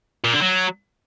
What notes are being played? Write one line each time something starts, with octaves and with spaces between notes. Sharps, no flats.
A#2
D3
F#3